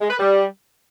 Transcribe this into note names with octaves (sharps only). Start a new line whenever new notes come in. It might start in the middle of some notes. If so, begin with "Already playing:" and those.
G#3
B4
G3